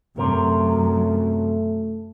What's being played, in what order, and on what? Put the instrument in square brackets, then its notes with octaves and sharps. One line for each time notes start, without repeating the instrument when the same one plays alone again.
[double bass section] F#2 [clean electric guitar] C3 A#4 [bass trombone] A3